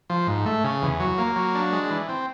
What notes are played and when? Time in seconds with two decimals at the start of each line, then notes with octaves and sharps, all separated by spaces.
0.10 F3
0.27 G#2
0.46 A3
0.64 C#3
0.82 E2
1.00 F#3
1.18 A#3
1.36 F#3
1.55 D4
1.73 G#3
1.90 E3
2.09 C4